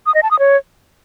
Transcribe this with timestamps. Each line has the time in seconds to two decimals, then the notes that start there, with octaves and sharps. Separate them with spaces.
0.06 D#6
0.14 D#5
0.23 A5
0.31 D#6
0.39 C#5